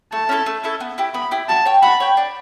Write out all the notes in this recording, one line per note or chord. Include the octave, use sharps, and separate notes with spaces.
A3 A5
C#4 E4 A4
A3
C#4 E4 A4
B3
E4 G4
B3 B5
E4 G4
F#4 A5
C#5 G5
F#4 B5
C#5 G5
D4